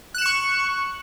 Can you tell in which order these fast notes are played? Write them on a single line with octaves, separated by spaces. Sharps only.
F#6 E7 C#7 C#6